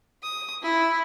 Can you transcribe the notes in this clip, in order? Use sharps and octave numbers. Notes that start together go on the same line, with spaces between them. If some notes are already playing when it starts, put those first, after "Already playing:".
D#6
E4